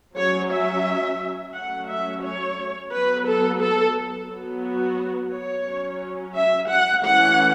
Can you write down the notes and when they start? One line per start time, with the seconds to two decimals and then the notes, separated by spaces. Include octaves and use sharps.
0.17 F#3 C#4 C#5
0.51 E5
1.55 F#3 A3 C#4 F#5
1.90 E5
2.23 C#5
2.92 F#3 B3 B4
3.27 A4
3.60 A4
4.30 F#3 B3
4.63 F#4
5.32 C#5
5.67 F#3 C#4
6.36 E5
6.70 F#5
7.04 E3 A3 C#4 F#5